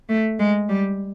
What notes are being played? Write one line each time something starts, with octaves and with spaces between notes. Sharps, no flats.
A3
G#3
G3